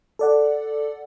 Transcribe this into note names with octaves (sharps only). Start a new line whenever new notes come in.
A4 D5 F#5